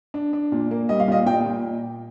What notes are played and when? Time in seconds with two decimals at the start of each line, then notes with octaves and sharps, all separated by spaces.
0.14 D4
0.33 D4
0.52 A#2
0.71 A#3
0.89 G3 D#5
1.00 F5
1.08 A#2 D#5
1.26 A#2 G5
1.46 A#2